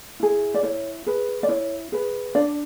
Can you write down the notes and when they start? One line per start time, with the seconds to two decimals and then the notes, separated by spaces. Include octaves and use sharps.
0.20 E4 G#4
0.54 D5
0.63 E4 C#5
1.06 G#4 B4
1.43 D5
1.48 E4 C#5
1.92 G#4 B4
2.35 D4 D5